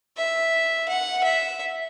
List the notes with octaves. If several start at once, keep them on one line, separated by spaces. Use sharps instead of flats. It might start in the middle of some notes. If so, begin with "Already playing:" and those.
E5
F#5
E5